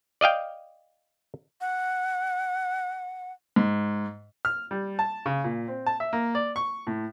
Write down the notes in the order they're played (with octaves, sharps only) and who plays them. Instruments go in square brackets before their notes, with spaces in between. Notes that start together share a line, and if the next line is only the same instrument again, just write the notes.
[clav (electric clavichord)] D5 D#5 F5 G5
[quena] F#5
[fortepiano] G#2
F6
G3
A5
C#3
A#2
C4
A5
E5
A#3
D5
C#6
A2